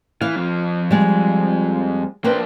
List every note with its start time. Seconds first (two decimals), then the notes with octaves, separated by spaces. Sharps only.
0.21 E3 F5
0.36 F2 F3
0.91 G3 G#3
2.24 A#3 D4 B4 C5 G5